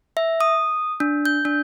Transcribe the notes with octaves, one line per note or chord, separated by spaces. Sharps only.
E5
D#6
D4
G6
D4